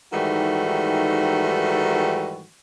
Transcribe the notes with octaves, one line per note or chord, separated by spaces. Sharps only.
G#2 D#3 E3 G3 A3 F#4